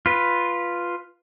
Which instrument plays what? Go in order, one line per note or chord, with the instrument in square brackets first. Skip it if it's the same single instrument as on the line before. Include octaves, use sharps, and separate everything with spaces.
[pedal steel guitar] F4 B4